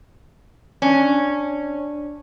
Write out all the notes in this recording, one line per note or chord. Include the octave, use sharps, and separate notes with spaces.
C#4 D4